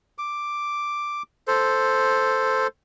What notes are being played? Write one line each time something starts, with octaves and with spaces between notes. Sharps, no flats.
D6
A4 C5